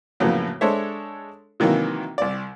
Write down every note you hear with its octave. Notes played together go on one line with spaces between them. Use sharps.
F2 A2 C#3 F#3 A#3 B3
G#3 D4 A4 C5 C#5 E5
C3 D#3 E3 F#3 A#3
C2 D5